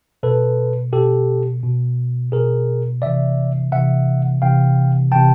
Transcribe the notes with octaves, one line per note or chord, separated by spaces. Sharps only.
B2 A4 B4
B2 G4 A4
B2
B2 G#4 A#4
C3 E3 D5 E5
C3 E3 E5 F#5
C3 E3 F5 G5
C3 E3 G5 A5